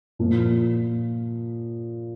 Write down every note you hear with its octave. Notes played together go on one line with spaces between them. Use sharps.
A#2 F3 A#3